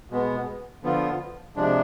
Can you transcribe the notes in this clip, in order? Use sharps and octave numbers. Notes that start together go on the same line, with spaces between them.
B2 G#3 B3
D3 F3 B3 F4
C3 F3 G#3 D4